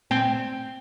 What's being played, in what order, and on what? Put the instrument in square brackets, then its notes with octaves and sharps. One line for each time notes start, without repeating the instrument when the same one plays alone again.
[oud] C4